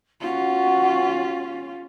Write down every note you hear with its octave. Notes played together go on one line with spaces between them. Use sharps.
C#4 F4 F#4